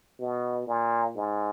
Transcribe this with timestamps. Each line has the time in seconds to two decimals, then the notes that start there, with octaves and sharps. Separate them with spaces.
0.20 B2
0.68 A#2
1.16 G#2